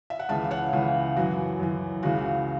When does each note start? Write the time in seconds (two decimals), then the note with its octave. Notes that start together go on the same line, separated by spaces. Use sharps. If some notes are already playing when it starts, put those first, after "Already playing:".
0.10 E5
0.19 F#5
0.29 C#2 C#3 E3 E5 A5
0.51 C#5 F#5
0.73 C#2 C#3 E3
1.16 F#2 E3 F#4
1.60 F#2 E3
2.03 C#2 C#3 E3 F#4